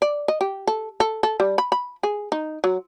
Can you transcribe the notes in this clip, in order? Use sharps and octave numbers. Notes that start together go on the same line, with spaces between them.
D5
D#5
G4
A4
A4
A4
G3
B5
B5
G#4
D#4
F#3